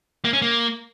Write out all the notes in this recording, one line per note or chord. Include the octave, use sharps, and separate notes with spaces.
A#3
C#4
A#3